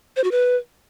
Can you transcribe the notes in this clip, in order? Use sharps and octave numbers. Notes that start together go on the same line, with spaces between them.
C5
F#4
B4